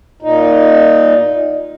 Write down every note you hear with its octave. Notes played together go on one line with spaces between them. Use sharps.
A#2 D#4